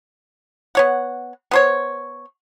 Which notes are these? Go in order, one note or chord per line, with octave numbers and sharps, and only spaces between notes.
B3 C#5 F#5
B3 C5 C#5